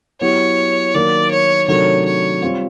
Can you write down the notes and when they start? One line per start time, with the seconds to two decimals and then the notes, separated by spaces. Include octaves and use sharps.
0.21 F#3 B3 E4 G4 C#5
0.94 D#3 F#3 A#3 D5
1.31 C#5
1.68 C3 D#3 F#3 A3 D4 C#5
2.05 C#5
2.42 G3 C4 F4